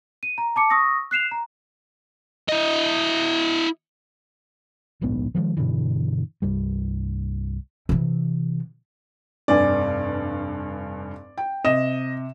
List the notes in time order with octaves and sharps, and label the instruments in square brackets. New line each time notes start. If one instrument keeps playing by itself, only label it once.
[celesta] D#7
A#5
A5 D6 C#7
C#6 D#6 E6 A#6
F#6 C7 E7 F7
A#5
[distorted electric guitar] E4 D#5
[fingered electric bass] D1 A#1 G#2 B3
D#3 F3 G3 G#3
G2 B2 D3 E3
C2 G2 G3
[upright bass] C3 E3
[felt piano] F1 G2 G#5 [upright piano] D5
[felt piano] G5
[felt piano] C3 E7 [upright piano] D#5